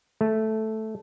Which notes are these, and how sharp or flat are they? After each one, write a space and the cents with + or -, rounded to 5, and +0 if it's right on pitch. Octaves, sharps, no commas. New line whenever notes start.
A3 -5